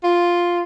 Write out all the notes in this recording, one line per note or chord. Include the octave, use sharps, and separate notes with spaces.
F4